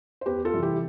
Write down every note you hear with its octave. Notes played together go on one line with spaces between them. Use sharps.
C5
E2 G4 B4
F4 A4
C3 E3 G3
E4 G4